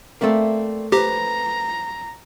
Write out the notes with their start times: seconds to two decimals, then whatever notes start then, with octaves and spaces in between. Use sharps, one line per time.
0.21 A3 A#3 C4 D5 E5
0.92 G4 B4 C5 A#5